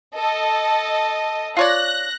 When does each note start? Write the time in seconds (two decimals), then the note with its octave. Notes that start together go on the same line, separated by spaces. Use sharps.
0.13 A4 D#5
1.57 F4 C#5 D5 F#6 A#6